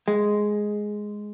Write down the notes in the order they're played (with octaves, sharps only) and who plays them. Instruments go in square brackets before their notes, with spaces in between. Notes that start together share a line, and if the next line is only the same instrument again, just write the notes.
[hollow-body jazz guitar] G#3